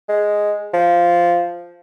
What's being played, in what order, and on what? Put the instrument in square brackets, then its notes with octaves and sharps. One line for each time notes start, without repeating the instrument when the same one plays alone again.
[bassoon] G#3
F3